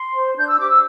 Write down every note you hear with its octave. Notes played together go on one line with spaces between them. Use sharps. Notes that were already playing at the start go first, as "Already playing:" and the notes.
Already playing: C6
C5
D4 G6
E6
G4 C5 D6
E6